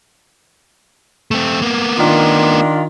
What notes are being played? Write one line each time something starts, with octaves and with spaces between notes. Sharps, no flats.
A3 C4
A#3 B3
D#3 D4 F4